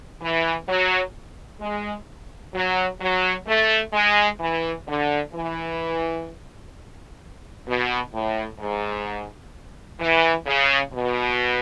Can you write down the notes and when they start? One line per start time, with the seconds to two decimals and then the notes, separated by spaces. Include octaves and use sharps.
0.21 E3
0.68 F#3
1.60 G#3
2.54 F#3
3.00 F#3
3.47 A3
3.93 G#3
4.39 E3
4.87 D3
5.33 E3
7.67 B2
8.13 A2
8.59 G#2
10.00 E3
10.46 C#3
10.93 B2